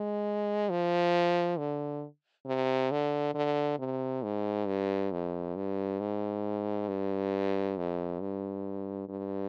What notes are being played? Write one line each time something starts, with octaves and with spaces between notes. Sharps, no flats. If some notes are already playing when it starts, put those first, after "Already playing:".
Already playing: G#3
F3
D3
C3
D3
D3
C3
G#2
G2
F2
G2
G#2
G2
F2
G2
G2